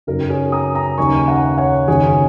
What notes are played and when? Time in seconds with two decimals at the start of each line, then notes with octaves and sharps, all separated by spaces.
0.07 F#2 C#3 F#3 D#4 A#4
0.30 G#4 C#5
0.52 A#5 D#6
0.75 A#5 D#6
0.98 D#2 C#3 A#3 D#4 G#5 C#6
1.28 F#5 A#5
1.57 C#5 F#5
1.88 F#1 F#2 D#3 G#4 C#5